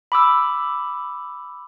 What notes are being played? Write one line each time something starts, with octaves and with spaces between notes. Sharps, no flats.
B5 D6 E6